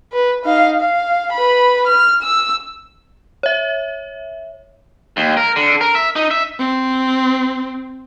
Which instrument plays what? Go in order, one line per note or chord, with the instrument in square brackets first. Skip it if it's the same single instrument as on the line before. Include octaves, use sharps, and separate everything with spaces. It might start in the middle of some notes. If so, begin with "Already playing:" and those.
[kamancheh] B4
D#4 F5
F5
B4 B5
F6
E6
[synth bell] C#5 E5
[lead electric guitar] D#2
A#4
D3
A#4
E5
D#4
E5
[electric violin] C4